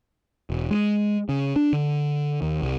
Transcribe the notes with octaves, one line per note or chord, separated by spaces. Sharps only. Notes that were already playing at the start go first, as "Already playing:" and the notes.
E1
G#3
C#3
D4
D3
D#2
C2